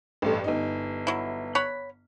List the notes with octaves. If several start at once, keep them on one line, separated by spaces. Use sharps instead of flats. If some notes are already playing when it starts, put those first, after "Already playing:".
A1 G2 A4
G1 D#4
F#3 E4
C#5 F#5 B5